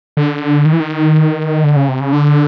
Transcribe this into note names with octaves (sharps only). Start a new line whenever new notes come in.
D3
D#3
E3
D#3
D3
C#3
C3
C#3
D3